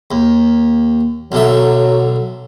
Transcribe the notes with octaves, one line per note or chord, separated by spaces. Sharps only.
D#2
B1 D3 F#3 E5